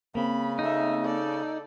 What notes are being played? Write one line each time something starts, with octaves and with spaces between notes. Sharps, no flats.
C#3 A#3 C4 B5
A3 D#4 E5
A4 D5